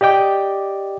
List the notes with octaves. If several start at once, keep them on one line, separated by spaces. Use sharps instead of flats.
G4 D5 D#5 G5 D6